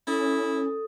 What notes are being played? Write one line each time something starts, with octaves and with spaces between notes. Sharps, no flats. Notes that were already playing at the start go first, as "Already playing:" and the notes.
C#4 E4 A4 D#6